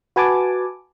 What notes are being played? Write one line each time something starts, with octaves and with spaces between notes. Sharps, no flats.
F#4 B4 G#5 A5 D6